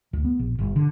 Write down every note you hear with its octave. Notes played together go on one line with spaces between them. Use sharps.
D2
B3
A#1
G1
D3